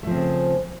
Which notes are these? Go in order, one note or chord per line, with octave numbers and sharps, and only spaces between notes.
C#3 F3 A3 C4